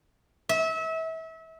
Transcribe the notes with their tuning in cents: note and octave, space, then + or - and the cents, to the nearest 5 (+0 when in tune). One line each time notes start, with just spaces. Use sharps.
E5 -30